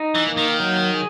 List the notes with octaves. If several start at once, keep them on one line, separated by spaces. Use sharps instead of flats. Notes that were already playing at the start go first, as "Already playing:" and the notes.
Already playing: D#4
E3
A#3
D#3
F#3
G#4